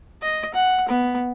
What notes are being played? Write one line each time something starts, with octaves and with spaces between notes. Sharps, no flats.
D#5
F#5
B3